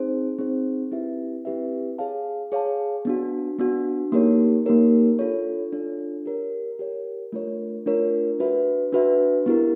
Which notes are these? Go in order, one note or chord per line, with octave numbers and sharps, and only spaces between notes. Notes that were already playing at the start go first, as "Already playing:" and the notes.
Already playing: C4 D#4 G#4 C5
C4 D#4 G#4 C5
C4 E4 G4 B4 E5
C4 E4 G4 B4 E5
G#4 C#5 F5 A5
G#4 C#5 F5 A5
B3 D4 F#4
B3 D4 F#4
A#3 D#4 G4 A#4 C#5
A#3 D#4 G4 A#4 C#5
D4 F4 A4 C#5
D4 F4 A4 C#5
G4 A#4 C#5
G4 A#4 C#5
A3 D4 F4 A#4 C#5
A3 D4 F4 A#4 C#5
D4 F#4 B4 E5
D4 F#4 B4 E5
B3 E4 G4 A#4